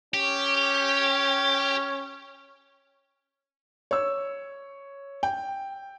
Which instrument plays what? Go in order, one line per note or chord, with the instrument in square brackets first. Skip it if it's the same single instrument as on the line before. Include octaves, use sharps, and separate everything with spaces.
[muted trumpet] C#4 [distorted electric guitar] G4
[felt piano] C#5 E6
G5